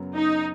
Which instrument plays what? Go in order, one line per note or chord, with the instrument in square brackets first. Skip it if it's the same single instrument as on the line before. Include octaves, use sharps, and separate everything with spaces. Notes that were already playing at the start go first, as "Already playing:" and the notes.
Already playing: [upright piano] F#2 C#3 F#3 B3
[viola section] D#4